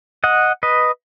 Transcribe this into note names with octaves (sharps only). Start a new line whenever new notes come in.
D#5 F#5
B4 D#5